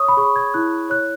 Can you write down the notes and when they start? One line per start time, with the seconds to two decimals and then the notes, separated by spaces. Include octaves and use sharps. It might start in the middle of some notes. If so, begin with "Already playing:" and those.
Already playing: C#5 C#6 D#6
0.08 B5
0.17 G#4 C#6
0.36 G#6
0.54 E4 F#6
0.90 C#5 F#6